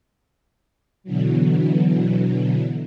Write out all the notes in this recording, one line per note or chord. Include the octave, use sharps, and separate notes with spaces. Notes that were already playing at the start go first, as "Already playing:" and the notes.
B2 D3 E3 F#3